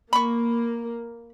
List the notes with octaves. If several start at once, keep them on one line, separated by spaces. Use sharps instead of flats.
A#3 B5 C#6